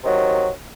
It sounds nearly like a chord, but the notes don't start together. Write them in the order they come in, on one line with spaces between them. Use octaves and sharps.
C3 D#3 F#3